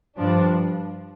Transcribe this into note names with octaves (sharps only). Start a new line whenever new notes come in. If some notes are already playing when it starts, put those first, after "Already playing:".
G2 F3 D4